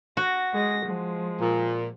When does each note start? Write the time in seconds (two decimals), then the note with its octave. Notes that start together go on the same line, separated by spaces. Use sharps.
0.17 F#4 A#6
0.53 G#3 G#4 A#6
0.85 F3 G#3
1.39 A#2